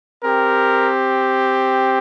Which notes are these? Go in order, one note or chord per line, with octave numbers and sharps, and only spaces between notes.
C4 G4 A#4